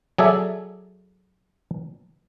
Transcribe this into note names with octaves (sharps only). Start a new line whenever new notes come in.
F#3 G#4 A4 D5 E5